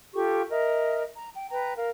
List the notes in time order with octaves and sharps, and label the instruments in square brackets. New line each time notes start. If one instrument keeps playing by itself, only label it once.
[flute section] F4 G4 A4 C#6
A#4 D#5 E5
A#5
G5
B4 G5 A#5
A#4 F5